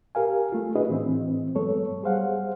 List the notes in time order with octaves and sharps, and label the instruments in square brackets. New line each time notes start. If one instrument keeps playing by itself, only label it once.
[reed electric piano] G4 A#4 F5 G#5
A3 F4
D4 E4 F#4 G#4 B4 D#5
A2 E3 C4
G2 F#3 G#3 B3 A4 C#5
G3 G#4 C5 F5 F#5